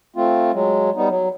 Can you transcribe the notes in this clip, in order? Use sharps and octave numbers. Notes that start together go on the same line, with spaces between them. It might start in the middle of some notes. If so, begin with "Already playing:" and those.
A3 C4 F4
F#3 G#3
G3 B3 D#4
F#3